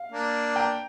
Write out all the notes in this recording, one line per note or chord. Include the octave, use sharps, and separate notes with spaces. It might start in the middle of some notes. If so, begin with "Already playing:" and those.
Already playing: F5
A#3 D4
G5 A#5